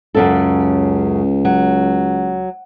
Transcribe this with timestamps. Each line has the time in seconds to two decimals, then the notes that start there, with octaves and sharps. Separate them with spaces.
0.15 C#2 F#2 C#3 A4
1.45 F#3